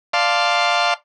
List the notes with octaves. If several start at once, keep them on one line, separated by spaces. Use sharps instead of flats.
D5 F5 A5 C6